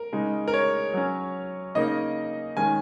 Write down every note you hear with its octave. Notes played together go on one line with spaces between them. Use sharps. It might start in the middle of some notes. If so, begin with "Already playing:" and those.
Already playing: A#4
C#3 G#3 D#4
A#4
C#5
F#3 C#4
C#3 A#3 D#4 D#5
D#3 G#3 C#4 G#5